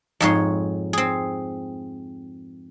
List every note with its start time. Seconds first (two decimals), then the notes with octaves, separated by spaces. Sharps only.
0.20 F2 G#2 C#5 C6
0.93 C4 G#4